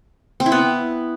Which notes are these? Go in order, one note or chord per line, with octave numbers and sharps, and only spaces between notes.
C4
E4
B3